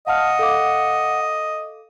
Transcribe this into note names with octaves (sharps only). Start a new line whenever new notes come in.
D#5 F5 F#5 A5 F6
A4 F5 D6